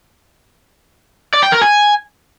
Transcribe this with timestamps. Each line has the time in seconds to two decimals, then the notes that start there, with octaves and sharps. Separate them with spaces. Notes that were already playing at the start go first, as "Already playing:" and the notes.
1.34 D5
1.43 G5
1.52 A#4
1.61 G#5